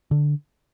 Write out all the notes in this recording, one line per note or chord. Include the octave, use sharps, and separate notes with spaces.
D3